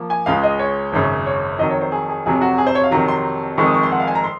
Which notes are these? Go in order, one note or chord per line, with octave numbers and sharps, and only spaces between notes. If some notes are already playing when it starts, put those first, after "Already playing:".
Already playing: F3 A#3
G#5
C#2 C#3 G#3 F5
D#5
C#5
G#1 F#2 C#3 C#5
C#5
F2 D#3 F#3 D#5
C#5
C5
G#4
G#4
F1 F2 C3 F#3 G#4
F#4
G#4
C5
C#5
F5
F2 C3 D#3 F#3 A#5
C6
F1 F2 D#3 G#3 C#6
D#6
C#6
C6
F#5
F5
G#5
A#5
C6